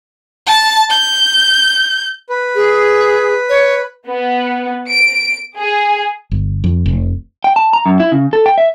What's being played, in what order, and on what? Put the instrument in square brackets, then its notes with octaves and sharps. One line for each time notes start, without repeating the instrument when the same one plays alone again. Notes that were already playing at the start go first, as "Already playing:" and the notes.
[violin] A5
G6
[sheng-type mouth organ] B4
[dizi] G#4
C#5
[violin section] B3
D7
G#4
[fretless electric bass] G1
F2
F1
[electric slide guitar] G5
A5
A#5
F#2
E4
C#3
A4
G5
E5